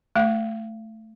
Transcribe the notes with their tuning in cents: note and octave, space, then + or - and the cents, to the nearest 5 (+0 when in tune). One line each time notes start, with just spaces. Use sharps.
A3 +0 F5 -40